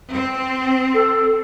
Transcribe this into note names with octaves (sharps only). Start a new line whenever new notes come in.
C4
A4